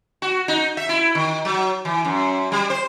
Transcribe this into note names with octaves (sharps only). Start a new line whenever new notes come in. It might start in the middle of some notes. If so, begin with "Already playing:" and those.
F#4
D#4
E5
E4
D#3
F#3
E3
F#2
G3
C5